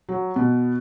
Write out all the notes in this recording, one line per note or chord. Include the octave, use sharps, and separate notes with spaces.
F#3
B2